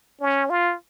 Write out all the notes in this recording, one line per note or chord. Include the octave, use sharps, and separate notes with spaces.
C#4
F4